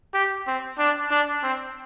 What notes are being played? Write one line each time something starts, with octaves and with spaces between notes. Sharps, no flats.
G4
C4
D4
D4
C4